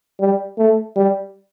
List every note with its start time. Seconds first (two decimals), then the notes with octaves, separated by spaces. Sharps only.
0.20 G3
0.58 A3
0.96 G3